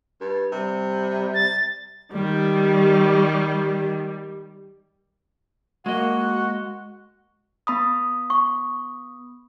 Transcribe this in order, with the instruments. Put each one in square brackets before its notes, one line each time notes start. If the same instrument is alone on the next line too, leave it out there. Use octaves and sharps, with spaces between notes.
[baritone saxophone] G2
[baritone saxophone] C3 [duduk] G3
[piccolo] A6
[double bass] D#3 [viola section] G3
[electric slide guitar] G#3 D#5 [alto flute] A#3 [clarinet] F#4 [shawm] F#5
[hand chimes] B3 B5 D#6
[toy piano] C#6